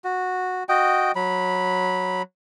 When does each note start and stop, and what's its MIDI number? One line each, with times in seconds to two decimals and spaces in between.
0.04 0.64 66
0.69 1.12 66
0.69 1.12 75
0.69 1.12 79
1.16 2.22 54
1.16 2.22 83